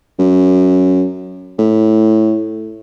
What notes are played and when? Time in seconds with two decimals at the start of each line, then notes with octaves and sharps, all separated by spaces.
0.19 F#2
1.59 A2